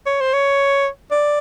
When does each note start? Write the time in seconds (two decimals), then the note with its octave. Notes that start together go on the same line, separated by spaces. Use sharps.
0.06 C#5
0.21 C5
0.33 C#5
1.11 D5